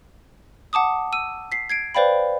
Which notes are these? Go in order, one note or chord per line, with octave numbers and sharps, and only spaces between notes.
F#5 A5 D6 D#6
E6 D#7
B6 C7
G#6 C7 D7
B4 C5 D5 F5 G5 B5